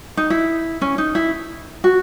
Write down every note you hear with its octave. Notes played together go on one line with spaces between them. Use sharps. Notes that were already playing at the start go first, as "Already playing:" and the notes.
D#4
E4
C#4
D#4
E4
F#4